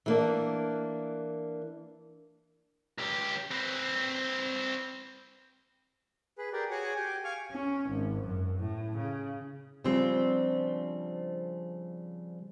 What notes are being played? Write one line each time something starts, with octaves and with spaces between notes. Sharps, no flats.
E3 A#3 D4
C#2 G4
C4 B4
G#4 B4
G4 G#4 A#4 D5
F#4 G#4 C#5 F#5 G#5 D6
G4 G#5 D6
F5 G#5 C#6 D6 F6
C#4
G#1
F#2
A2
C#3
C#3 F3 G3 C4 D4